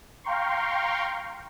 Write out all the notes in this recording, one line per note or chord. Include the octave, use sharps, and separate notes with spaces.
F5 G5 A#5 C6 C#6